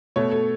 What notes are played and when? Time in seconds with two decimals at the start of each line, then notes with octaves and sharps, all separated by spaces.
0.16 B2 A3 C#5
0.31 A4